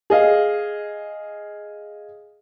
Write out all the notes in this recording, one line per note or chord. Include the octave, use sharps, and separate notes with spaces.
G#4 D#5 F5